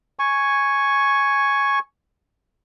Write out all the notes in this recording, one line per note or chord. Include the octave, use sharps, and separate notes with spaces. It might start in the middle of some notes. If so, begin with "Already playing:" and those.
G#5 C#6